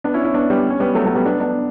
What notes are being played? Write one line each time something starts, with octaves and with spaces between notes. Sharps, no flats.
B3 D4
C#4 E4
C#4 E4
B3 D4
G3 B3
C#4
G3 B3
F#3 A3
F#3 A3
G3 B3
B3 D4
B3 D4